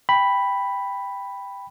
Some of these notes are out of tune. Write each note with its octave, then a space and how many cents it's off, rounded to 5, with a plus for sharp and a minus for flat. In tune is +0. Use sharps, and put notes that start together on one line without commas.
G5 +10 B5 +0